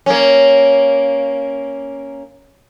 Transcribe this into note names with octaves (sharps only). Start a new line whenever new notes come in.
A#3 C#4